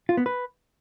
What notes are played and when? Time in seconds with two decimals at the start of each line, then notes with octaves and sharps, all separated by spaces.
0.09 F4
0.17 B3
0.26 B4